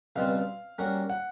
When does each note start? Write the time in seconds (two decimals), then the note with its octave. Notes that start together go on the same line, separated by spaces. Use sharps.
0.16 C#2 B2 G3 C4 F4 F5
0.78 G3 A#3 C#4 F#4 A#4
1.10 F#5